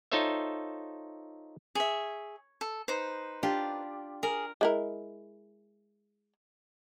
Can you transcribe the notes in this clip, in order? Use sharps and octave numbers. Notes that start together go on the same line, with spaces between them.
D#4 F4 A4 C5 C#5 E5
G#4 C#5 E5
A4
D#4 B4 C5
D4 F4 G4
G#4 A#4
G#3 E4 A#4